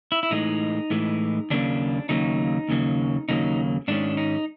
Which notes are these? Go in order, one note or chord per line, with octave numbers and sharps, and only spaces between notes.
E4
E4
A2 E3 G#3 D#4
A2 E3 G#3
D#2 C#3 F#3 A#3 D4
D#2 C#3 F#3 A#3 D#4
D#2 C#3 F#3 A#3
D#2 C#3 F#3 A#3 D#4
G#2 D#3 G#3 C#4 D4
D#4